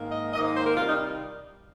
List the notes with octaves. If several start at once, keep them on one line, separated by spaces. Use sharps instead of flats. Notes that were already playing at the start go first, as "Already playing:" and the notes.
Already playing: G#2 D#3 A#3
D#5
G#2 D#3 A#3 D#5
C5
A#4
C3 D#3 G3 F4
D#4